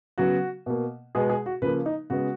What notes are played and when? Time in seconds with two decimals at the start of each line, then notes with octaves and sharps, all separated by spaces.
0.18 C#3 F#3 B3 F#4
0.66 B2 A#3
1.15 B2 G#3 B3 G#4
1.29 G#4
1.46 F#4
1.62 C#3 F3 A#3 B4
1.86 D#4
2.10 C#3 G#3 B3 F#4